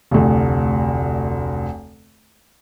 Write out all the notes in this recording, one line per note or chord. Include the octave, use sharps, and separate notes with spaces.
F1 D2